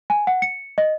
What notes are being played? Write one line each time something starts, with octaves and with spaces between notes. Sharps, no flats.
G#5
F#5
C#7
D#5